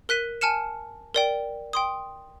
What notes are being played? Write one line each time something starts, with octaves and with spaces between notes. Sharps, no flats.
A#4 F#6 B6 D#7
G#5 A5 F6 C#7 E7
A#4 D5 G5
G5 C6 D#6